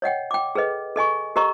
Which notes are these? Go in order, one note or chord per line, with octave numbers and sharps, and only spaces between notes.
C#5 D#5 F#5 G5
G5 D6
G#4 A4 B4 D#5
A4 D#5 G#5 C#6
G4 A4 A#4 D#5 A#5 C#6